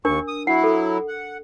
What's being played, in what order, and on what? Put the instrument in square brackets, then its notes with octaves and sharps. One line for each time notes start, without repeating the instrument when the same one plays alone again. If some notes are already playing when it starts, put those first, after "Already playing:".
[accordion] D#2 C#6 [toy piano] D4 A#4
[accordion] D#6
[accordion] F#3 E4 [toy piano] F#5
[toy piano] A4
[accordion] F#5